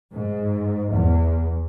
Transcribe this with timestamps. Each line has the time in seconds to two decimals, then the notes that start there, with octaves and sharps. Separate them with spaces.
0.13 G#2
0.93 E2